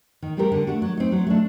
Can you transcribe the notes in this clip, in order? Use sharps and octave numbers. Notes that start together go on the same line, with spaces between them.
D#3
G3 C4 G4 A#4
D3
A3 D4 F#4
F#3
C4 D#4
F#3
A3 D4